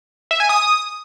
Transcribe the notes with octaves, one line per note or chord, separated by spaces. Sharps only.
E5
G#5
D#6